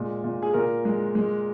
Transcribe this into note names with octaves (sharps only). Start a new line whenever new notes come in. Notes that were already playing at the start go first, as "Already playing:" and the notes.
Already playing: A#2 G#3
A#2
G#4
A#2 A#4
G#3
G#3